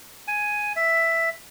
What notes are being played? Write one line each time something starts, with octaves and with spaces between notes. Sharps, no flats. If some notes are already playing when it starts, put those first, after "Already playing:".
G#5
E5